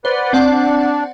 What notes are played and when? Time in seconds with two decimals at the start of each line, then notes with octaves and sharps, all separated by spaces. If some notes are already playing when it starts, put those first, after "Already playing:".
0.05 B4 C5 D5 F#5
0.33 C4 D4 D5 F#5